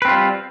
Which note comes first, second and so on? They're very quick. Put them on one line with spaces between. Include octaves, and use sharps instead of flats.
B4 C4 F4 G3